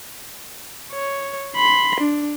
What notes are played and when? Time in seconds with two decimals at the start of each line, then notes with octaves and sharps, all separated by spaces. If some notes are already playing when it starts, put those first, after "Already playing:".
0.92 C#5
1.56 B5 C6
2.00 D4